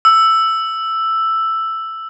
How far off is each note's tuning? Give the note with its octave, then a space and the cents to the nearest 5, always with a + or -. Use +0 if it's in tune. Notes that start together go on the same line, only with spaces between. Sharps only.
E6 +5